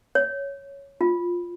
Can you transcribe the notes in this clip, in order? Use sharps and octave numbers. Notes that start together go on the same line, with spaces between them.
C#5
F4